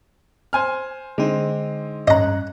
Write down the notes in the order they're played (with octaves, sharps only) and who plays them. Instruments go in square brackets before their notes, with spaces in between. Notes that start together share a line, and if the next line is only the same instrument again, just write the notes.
[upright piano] C5 G#5 F6
[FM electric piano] D3 D#4 [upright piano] G#3 C4
[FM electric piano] G2 C#4 F#6 [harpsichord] D#5 A#5